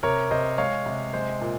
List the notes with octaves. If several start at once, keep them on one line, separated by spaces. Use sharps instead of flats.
C3 A#4 C#5
C3 C5 D#5
G#3 C#5 F5
C3
G#3 C5
A#2